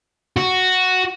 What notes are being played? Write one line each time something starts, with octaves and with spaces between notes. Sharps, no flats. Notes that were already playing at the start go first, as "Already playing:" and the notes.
F#4